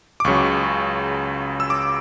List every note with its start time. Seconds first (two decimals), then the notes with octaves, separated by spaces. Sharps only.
0.20 D6
0.25 C#2 C#3 F#3 C#6
1.60 E6
1.70 D6